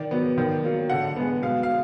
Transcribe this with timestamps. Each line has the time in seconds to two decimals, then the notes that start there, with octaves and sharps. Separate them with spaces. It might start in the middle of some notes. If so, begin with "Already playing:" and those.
Already playing: D#3 D5
0.11 F#3 B3
0.38 D#3
0.63 F#3 A#3
0.90 D3 F#5
1.16 G#3 B3
1.42 B2 F5
1.63 F5